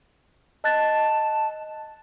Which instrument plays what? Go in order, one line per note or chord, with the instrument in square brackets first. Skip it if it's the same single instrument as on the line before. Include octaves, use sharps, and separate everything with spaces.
[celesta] D#5 F#6 A6 [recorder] A5